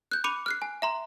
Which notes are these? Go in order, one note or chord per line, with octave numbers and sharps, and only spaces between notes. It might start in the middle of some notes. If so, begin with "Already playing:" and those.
F#6 G6
B5 D6 C#7 D#7 F7
F6 F#6 C7
G#5
E5 A#5 C6